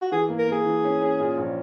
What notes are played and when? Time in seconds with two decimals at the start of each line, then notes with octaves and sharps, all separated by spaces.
0.02 F#4
0.12 E3 G#4
0.29 A#3
0.38 A#4
0.48 A#3 G#4
0.65 E3
0.84 C#4
1.01 C#4
1.20 A#2
1.37 A#1